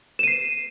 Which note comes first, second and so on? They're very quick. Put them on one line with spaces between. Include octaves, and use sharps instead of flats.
E7 D#7 C7